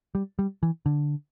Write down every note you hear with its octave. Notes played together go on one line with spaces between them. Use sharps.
G3
G3
E3
D3